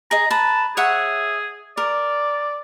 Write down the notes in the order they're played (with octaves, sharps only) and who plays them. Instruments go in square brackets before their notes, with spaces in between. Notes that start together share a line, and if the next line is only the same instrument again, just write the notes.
[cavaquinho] G#4 D#5 [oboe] A#5
[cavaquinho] B4 A#5 [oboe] A5
[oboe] G#4 [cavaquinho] C#5 E5 F#5
[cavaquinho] A#4 [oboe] D5